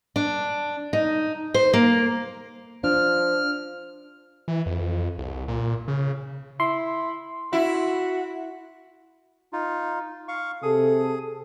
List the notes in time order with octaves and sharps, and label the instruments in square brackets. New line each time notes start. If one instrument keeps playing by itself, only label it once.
[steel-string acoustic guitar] D4
D#4
C5
A#3
[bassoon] F3 [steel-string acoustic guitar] D4 [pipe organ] F6
[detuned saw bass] E3
F2
C2
A#2
C#3
[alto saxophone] E4 [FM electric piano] C6
[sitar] E4 [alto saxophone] F#4
[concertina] D#4 F4
F5 C#6
[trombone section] C3 A4 [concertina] G#4 D#6